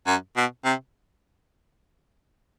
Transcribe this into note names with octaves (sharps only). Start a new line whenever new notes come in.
F#2
B2
C3